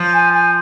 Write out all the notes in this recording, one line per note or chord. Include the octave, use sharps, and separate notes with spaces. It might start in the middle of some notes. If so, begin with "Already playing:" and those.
Already playing: F3
G#5
G#5